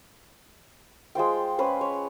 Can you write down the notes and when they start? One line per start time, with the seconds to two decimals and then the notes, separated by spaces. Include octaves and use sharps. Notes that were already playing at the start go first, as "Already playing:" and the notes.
1.15 G#3 F4 C5 G5
1.59 C#4 B4 C5
1.81 C#5